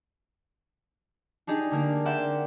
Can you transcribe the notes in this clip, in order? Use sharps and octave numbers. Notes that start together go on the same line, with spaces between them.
D4 D#4 G4 G#4
D3 A#3 A#4
A#3 C4 D5 E5 F#5 G5